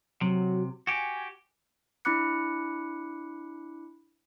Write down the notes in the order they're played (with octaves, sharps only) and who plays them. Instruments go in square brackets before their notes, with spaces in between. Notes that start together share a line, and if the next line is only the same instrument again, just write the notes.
[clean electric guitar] C3 [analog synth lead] F#3
[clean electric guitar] F#4 G4 [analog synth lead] G#5
[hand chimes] D4 E4 B5 D6 F#6 C#7